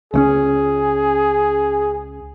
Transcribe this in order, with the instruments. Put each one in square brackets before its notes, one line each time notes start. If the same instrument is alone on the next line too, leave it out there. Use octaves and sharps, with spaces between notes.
[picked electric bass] C#2 A3 C#4 [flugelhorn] G#4